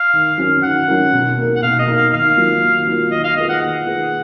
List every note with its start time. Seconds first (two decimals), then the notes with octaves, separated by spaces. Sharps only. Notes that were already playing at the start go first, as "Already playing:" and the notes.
Already playing: F5
0.13 D#3
0.38 F#3 C#4 F#4 A#4
0.63 D#3 F#5
0.88 F#3 C#4 F#4 A#4
1.13 B2
1.38 A#3 D#4 A#4
1.56 F#5
1.63 B2 F5
1.79 D#5
1.88 A#3 D#4 A#4
1.96 F5
2.12 D#3 F5
2.37 F#3 A#3 F4
2.62 D#3
2.87 F#3 A#3 F4
3.11 D#3 D#5
3.24 F5
3.37 A#3 F4 G#4 B4 D#5
3.49 F#5
3.62 D#3 F#5
3.86 A#3 F4 G#4 B4